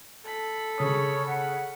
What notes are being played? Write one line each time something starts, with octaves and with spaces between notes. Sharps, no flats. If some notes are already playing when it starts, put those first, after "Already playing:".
A4 B5
C#3 C#5 D#6
F#5